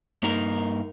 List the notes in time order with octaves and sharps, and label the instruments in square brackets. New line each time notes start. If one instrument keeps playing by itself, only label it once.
[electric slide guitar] G2 A#3 D#4 A#4